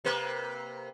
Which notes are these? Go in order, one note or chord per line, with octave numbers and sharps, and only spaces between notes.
C3 A#3 B4